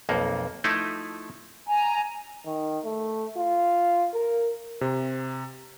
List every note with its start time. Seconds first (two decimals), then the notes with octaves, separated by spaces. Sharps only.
0.09 B1 F2 A#3
0.64 F3 A3 D#4 E4
1.68 G#5 A#5
2.46 D#3
2.84 A3
3.37 F4
4.14 A#4
4.81 C3